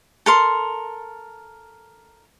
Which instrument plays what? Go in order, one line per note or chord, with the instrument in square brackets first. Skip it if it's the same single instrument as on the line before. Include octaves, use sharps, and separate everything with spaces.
[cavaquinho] A4 A#4 C6